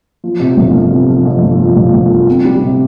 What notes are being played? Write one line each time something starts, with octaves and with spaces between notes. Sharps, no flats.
F3
C3
G1
F3
C3
F3
F2
G1
F3
G1
G1
F3
C4
G3
C3